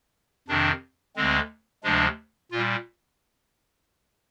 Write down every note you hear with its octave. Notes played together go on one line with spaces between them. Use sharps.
F2 C3 D#3 D4
D2 D3 G#3 C4
D2 C3 F3 G#3 D4
A#2 G3 F4